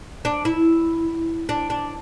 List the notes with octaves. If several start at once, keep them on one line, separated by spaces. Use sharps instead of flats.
D4
E4
D4
D4